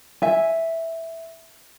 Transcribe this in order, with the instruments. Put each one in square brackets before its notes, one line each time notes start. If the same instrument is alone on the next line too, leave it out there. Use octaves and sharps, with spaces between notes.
[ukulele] E5 G#5